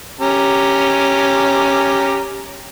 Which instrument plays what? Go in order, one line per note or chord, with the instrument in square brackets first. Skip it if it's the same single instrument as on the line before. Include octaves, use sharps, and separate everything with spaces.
[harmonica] C#4 G4 A#5